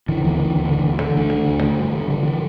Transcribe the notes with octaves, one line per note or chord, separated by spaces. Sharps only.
D3 E3
D2 E3
D3
D2
D3
D2
D3
D2 A3 D4
D3
D2
D3
G2
D3
G2 D3
D3 E3